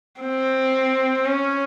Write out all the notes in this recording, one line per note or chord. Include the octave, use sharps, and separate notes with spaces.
C4
C#4